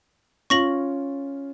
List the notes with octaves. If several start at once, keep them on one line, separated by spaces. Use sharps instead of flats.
C#4 F4 C#6 A#6 F#7